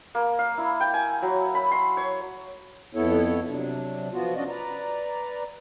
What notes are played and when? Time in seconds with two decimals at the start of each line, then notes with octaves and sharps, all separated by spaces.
0.15 A#3
0.39 F5
0.58 E4
0.81 G5
0.94 G#5
1.22 F#3
1.55 B5
1.72 C6
1.97 C#5
2.94 F2 B3 E4 A4 C#5
3.48 C3 F#3 D4
4.12 F3 B3 F4 F#4
4.35 C#4 D4 F#4 D5 D#5
4.49 B4 D5 A#5